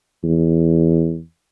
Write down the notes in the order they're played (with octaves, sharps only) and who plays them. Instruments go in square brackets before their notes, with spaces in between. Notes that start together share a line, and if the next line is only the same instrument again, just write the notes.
[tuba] E2